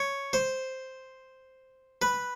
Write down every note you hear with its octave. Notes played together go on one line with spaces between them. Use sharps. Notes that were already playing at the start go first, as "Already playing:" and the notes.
Already playing: C#5
C5
B4